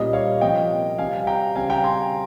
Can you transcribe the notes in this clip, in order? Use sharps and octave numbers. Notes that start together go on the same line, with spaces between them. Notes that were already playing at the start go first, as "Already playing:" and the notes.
Already playing: A#2 G3 A#3 C#4 D#5
C#5 F5
C3 F3 A#3 C#4 D#5 G5
C3 G3 C4 F5 G#5
G5 A#5
C#3 G3 C4 F5 G#5
G5 A#5
G#5 C6